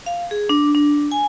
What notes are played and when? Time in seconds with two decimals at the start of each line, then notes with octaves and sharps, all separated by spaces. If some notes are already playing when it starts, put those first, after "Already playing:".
0.06 F5
0.31 G#4
0.49 D4
0.75 D4
1.12 G#5